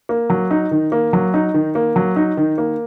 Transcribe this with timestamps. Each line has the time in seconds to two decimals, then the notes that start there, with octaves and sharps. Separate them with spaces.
0.09 A#3
0.30 F#3
0.51 D#4
0.71 D#3
0.92 A#3
1.13 F#3
1.34 D#4
1.54 D#3
1.75 A#3
1.96 F#3
2.16 D#4
2.37 D#3
2.58 A#3